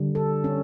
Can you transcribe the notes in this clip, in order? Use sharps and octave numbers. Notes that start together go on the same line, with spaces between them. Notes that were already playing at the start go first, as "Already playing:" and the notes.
Already playing: D3 G3
A4
C#4